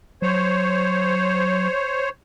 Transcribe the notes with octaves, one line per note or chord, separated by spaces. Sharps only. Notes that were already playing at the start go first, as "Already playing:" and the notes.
F#3 C5 C#5